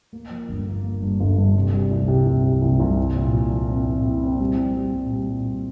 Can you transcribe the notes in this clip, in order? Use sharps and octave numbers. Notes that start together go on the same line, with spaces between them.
A#3
F3
G1
A#3
A#3
G2
G1
G2
C3
G3
C2
C3
C2
C3
C2
C2
E4
A#2
F3
F3
C4
A#2
E4
C4
G3
G3
G3
A#2
G3
A#2
G3